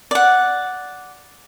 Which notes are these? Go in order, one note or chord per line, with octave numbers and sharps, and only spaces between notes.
D5 F#5